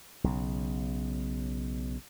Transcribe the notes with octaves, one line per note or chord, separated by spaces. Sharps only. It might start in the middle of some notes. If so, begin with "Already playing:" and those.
B1 C#3